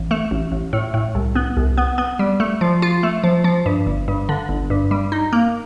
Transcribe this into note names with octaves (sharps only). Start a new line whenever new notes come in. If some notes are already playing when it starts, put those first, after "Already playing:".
Already playing: A1
A3
A1
A1
A2
A2
C2
B3
C2
B3
B3
G3
A3
F3
F4
A3
F3
F3
G2
G1
G2
D3
G1
G2
G3
D#4
A#3